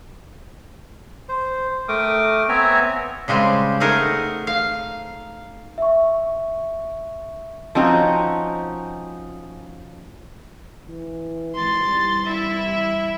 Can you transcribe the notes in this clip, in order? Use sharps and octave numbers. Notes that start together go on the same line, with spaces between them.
C5
A3 A#4 G5 D6 D#6
B3 C4 C#5 E5 G#5 A#5
C#3 G3 G#3 C4
A3 D#4 G#4 A#4 F#5
F5
E5 C#6
F3 C4 C#4 D#4 F#4
E3
G#1 C6 A6
C3 E3 G3
E4 E5